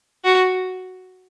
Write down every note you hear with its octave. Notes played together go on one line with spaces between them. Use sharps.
F#4